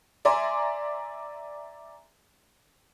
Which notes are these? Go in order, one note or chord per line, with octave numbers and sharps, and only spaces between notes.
D5 E5 G#5 A#5 C6